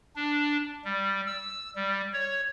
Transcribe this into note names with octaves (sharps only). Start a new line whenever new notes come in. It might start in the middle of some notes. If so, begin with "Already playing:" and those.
D4
G3
E6
G3
C#5